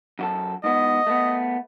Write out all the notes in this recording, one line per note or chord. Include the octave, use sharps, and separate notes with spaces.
F#2 F#4 A4
G#2 B3 D#5
A3 B3